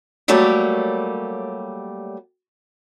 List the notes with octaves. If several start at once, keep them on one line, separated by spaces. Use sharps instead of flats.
F#3 G3 A3 A#3 G4 C#5